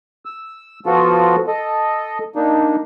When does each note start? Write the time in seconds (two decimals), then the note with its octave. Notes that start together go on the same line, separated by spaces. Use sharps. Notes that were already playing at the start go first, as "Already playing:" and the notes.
0.25 E6
0.86 F3 B3 F4 F#4 A4
1.47 A4 D#5
2.36 A#3 D4 D#4